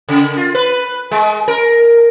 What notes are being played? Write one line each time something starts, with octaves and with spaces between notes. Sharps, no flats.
C#3
F4
B4
G#3
A#4